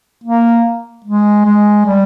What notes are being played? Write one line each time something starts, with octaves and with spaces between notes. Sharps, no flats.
A#3
G#3
G#3
G3